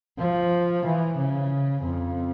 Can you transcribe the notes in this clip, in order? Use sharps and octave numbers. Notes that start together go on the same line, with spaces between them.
F3
E3
C#3
F2